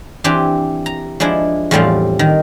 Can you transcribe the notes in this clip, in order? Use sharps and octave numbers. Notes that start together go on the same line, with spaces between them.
E3 C4 D4 G4
A#5
F3 G#3 D4 E4
E2 A2 F3 G3 C4 F5
D#3